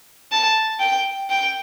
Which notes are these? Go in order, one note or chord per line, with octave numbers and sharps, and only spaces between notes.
A5
G5
G5